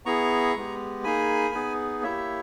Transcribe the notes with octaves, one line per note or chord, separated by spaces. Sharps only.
B3 E4 G#4 A#5 C#6
G#3 B3 G4
A#3 D#4 G#4 G#5 B5
B3 D#4 G#4
A#3 E4 G4 C#5 E5